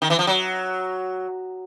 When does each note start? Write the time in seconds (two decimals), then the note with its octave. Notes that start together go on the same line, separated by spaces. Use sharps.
0.02 D#3
0.10 E3
0.19 F3
0.27 F#3